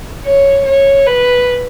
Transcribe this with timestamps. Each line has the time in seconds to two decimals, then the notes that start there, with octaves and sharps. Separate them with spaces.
0.25 C#5
0.66 C#5
1.07 B4